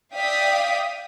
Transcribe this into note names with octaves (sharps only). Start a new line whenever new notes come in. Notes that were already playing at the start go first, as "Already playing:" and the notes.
D5 E5 F5 G5 D#6 B6